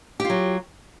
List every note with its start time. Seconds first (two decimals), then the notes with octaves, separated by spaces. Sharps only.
0.20 G4
0.25 F4
0.30 F#3